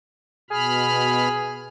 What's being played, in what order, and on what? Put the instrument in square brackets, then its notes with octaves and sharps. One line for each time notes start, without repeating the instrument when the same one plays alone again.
[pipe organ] B2 B5 F6 [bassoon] G#4